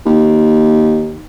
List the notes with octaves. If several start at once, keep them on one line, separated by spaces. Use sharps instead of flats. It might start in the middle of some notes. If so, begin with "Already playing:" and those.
D#2